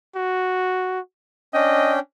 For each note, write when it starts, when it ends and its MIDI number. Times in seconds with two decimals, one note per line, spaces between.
0.16 1.00 66
1.54 1.99 61
1.54 1.99 62
1.54 1.94 75
1.54 1.99 79